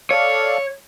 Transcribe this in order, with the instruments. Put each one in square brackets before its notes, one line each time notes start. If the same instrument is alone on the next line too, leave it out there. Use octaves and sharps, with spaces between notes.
[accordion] A4 D5 F5 [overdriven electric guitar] C#5